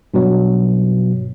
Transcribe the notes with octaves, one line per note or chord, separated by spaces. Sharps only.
G2 B2 F#3